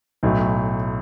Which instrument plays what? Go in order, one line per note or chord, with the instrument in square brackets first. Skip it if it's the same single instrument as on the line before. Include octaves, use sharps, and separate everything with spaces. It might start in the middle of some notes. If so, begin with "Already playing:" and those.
[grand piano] B1 A2 F#3